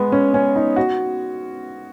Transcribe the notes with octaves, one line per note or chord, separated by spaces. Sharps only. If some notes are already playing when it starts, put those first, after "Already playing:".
Already playing: G#3 B3
C#4
C#4
D#4
F#4